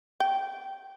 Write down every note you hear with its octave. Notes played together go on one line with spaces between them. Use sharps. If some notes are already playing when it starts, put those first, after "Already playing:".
G5